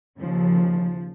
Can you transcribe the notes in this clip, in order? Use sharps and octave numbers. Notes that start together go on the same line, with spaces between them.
D#2 C#3 F3